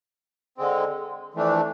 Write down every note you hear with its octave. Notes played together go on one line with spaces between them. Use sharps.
D3 G#3 C4
F2 E3 A3 D4